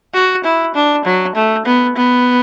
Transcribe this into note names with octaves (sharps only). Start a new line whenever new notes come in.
F#4
E4
D4
F#3
A3
B3
B3